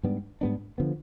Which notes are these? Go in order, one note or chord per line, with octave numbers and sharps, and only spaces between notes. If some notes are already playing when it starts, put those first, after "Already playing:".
G#2 G3 B3 D4
G#2 G3 B3 D4
D3 F3 B3